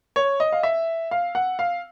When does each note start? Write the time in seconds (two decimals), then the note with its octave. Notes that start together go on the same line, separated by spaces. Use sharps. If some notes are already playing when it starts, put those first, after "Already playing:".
0.16 C#5
0.40 D#5
0.52 F5
0.63 E5
1.11 F5
1.35 F#5
1.59 F5